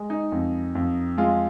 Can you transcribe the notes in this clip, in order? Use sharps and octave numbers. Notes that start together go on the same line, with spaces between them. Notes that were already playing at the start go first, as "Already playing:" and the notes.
Already playing: G#3
D#4
F2
F2
G#3 F4